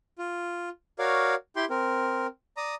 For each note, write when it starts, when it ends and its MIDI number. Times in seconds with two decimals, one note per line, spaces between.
0.18 0.69 65
0.99 1.35 66
0.99 1.35 70
0.99 1.35 73
0.99 1.35 74
0.99 1.35 77
1.56 1.65 64
1.56 1.65 67
1.56 1.65 79
1.56 1.65 84
1.70 2.27 60
1.70 2.27 70
2.57 2.75 74
2.57 2.75 82
2.57 2.75 87